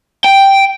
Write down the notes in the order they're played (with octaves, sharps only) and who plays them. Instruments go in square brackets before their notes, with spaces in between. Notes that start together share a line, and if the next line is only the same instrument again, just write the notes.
[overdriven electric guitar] G5